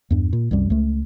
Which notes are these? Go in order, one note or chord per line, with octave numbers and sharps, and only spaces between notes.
E2 G2
A#2
C2 F#2 G3
C#2 A3